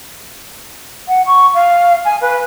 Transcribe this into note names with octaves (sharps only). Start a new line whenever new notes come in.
F#5
C#6
F5
G#5
B4